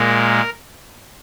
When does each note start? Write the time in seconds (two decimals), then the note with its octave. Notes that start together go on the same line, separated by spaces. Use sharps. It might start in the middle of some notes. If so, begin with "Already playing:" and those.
Already playing: A#2 G#3 A#4